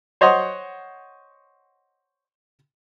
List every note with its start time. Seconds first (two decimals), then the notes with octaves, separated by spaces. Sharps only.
0.21 C5 C#5 D#5 F#5 C6